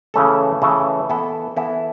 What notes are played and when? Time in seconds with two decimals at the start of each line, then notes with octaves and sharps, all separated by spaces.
0.14 C#3 E3 A3 C#4 A4
0.62 C#3 E3 A3 C#4 A4
1.09 E3 B3 E4 A4
1.57 E3 B3 E4 A4